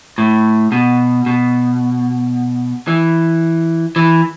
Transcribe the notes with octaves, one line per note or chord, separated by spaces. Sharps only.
A2
B2
B2
E3
E3